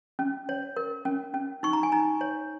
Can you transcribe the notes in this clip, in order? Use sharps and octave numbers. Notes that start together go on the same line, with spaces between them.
C#4
C#5
A#4
C#4
C#4
D#4 C#6
A#5
G#5
D#4 A#5
C#5